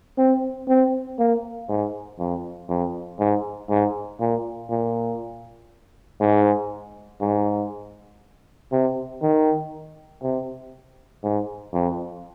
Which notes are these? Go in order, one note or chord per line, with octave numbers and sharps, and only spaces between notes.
C4
C4
A#3
G#2
F2
F2
G#2
G#2
A#2
A#2
G#2
G#2
C3
D#3
C3
G#2
F2